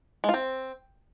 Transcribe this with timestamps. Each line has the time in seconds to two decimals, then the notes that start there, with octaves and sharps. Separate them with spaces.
0.24 G#3
0.29 F4
0.34 C4